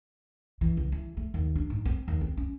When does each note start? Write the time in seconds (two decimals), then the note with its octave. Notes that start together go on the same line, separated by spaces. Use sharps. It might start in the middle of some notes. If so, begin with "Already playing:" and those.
0.61 E3
0.77 C#2
0.92 E3
1.17 A3
1.34 D#2
1.56 D4
1.70 G#2
1.85 C4
2.08 D#2
2.21 C4
2.37 C#4